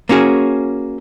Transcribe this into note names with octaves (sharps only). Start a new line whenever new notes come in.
A#3 C#4 F#4 G#4